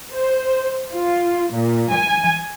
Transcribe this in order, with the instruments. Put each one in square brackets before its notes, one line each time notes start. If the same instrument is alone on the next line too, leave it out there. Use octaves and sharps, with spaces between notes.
[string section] C5
F4
A#2
G#5